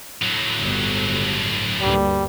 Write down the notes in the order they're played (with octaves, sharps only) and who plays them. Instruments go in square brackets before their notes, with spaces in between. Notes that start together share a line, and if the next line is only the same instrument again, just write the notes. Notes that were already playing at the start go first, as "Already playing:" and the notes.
[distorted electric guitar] A2 F#3
[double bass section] G1
[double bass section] D2 G2 A#3 [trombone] G3